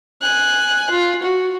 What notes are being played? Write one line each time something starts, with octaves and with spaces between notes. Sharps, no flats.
G#5 F#6
F4
F#4